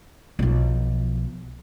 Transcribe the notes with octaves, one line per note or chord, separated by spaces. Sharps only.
B1 F3